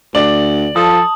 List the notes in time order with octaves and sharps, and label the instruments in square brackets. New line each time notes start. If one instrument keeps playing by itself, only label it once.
[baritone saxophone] D2 [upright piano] D5 [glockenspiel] F#7
[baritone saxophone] F3 [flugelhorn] A4 [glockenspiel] A5 D#6